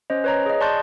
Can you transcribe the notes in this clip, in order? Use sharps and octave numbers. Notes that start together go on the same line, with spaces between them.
C#4 C5 D#5
B4 C#5 A#5
G#4 D#5
D5 A5 C6 C#6 F#6 G6